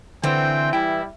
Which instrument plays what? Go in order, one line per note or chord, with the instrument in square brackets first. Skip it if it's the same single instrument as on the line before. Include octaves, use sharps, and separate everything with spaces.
[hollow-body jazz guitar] D3 [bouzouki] E3 [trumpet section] C4 C5 G5
[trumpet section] G3 E4 [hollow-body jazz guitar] G5